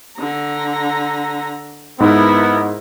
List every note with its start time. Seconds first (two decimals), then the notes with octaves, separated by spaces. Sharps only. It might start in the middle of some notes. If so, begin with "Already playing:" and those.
0.19 D3 A#5
2.00 G#2 B3 E4 A#4